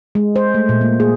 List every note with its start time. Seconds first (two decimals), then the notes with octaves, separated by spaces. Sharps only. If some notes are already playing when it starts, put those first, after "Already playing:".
0.15 G#3
0.36 C5
0.54 A3
0.69 A#2
0.81 A#3
1.00 G#4